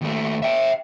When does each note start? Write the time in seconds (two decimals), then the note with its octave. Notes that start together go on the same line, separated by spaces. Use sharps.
0.01 D#2 A3
0.42 E5 G5